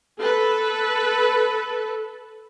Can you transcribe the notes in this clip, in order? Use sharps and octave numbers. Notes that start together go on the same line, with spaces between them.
A4 B4